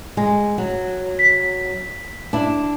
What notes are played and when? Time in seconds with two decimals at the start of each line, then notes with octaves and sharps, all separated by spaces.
0.17 G#3
0.58 F#3
1.19 B6
2.33 D4 E4